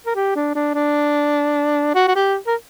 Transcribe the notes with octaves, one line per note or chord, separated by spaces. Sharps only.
A#4
G4
D4
D4
D4
F#4
F#4
G4
A#4